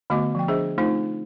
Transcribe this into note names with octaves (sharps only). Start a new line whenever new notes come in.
D3 A3 B3 F#4 D#5 D6
F3 G5
D4 G#4 C5 D#5 E5
A3 C4 D#4 F4 C5